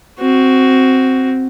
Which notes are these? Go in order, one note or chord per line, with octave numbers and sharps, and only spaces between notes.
C4 F#4